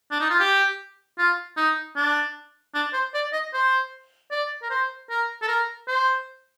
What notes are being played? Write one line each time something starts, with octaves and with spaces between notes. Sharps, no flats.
D4
D#4
F4
G4
F4
D#4
D4
D4
C5
D5
D#5
C5
D5
A#4
C5
A#4
A4
A#4
C5